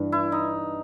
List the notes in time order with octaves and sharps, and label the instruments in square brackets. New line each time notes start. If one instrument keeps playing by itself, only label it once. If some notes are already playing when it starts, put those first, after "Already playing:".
Already playing: [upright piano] G2 E3
[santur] E4
D#4